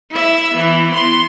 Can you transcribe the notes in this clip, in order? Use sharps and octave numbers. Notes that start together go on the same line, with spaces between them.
E4 E5
E3 B3
B3 C6